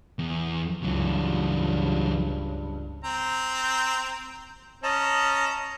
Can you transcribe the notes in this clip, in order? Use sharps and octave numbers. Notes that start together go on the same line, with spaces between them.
E2
C#2 G2 E3 F#3
C4 A#5
C#4 D#5 A5 A#5